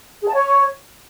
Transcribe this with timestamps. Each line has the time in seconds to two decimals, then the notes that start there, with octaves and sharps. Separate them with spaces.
0.22 G#4
0.28 A5
0.33 C#5